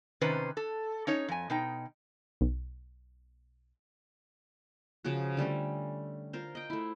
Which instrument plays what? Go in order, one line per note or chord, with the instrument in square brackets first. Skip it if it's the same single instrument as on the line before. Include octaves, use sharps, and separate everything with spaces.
[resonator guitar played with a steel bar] C3 D#3 C#4 B4 C5
A4
C#4 D#4 C#5
F2 G#5
B2 D#4 G5
[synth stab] B1
[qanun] C#3 F3 C#4 F#4
D3 G3 A3 C#4
F4 A#4 C5
D#5 G5
A3 E4